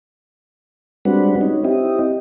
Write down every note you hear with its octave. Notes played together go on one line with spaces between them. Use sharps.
G3 G#3 C4 D4 F#4 B4
C#4 D#4
C4 E4 G4 D#5